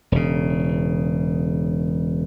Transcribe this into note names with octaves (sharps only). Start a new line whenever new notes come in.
E1 C#3